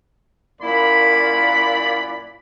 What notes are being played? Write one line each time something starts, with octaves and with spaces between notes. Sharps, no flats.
F#2 A#2 A#3 E4 D5 B5